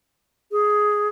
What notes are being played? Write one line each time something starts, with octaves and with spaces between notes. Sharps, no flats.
G#4